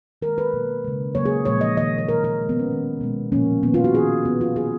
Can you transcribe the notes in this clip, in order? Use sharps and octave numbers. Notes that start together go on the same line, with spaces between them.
D#3 G#3 A#4
B4
B2 F#3 A#3
C#3 G#3
C#3 F#3 A#3 C#5
G#4
A#2 F3 G#3 C#5
D#5
D#3 A#3 D#5
C#5
B2 A#3 A#4
A#4
C#3 G#3
B3
C#4
D#3 A#3
B2 G#3
A#2 F3 A#3 C#4
D#3 A#3 B3
F4
F#4
D#3 A#3 G#4
B2 A#3 B3
F4
D#3 F#3 A#3 G#4